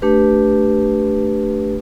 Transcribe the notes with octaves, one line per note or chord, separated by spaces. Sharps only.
A3 D4 G4 B4